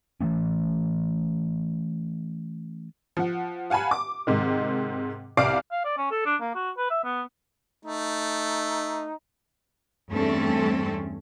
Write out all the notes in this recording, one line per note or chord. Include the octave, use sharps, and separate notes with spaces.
E3 F#3 A3 C#4
F3 F#5
F5 F#5 G#5 A5 B5
D6
G#2 C3 D#3
C2 D5 F5 D6 C7 D7
F5
D5
C#4
A4
D4
A#3
F#4
B4
E5
B3
A3 D#4
E2 G2 A3 C4 C#4 A4